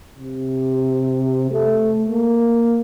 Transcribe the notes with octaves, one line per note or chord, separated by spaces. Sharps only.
C3
A3
A#3